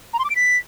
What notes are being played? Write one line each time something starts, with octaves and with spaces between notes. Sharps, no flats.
A#5
C6
D6
D7
B6